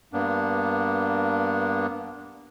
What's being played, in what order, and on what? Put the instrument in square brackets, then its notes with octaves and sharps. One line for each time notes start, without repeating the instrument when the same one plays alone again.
[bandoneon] G2 A#3 B3 D4